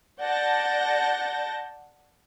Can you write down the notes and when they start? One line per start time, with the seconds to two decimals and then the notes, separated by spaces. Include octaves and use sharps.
0.20 D5 F#5 A5 G6 A6 A#6